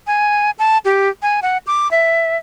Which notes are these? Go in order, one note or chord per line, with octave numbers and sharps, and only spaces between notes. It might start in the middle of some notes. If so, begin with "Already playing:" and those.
G#5
A5
G4
G#5
F#5
D6
E5